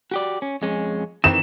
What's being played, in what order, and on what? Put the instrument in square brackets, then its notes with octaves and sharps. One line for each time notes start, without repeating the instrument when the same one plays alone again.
[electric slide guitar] F#4 G4 D5
C#4
F2 G#3 C#4
[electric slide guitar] D#3 E3 C4 [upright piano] E7